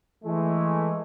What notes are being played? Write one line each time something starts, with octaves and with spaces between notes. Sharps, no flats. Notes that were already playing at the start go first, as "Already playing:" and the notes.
E3 G#3 A3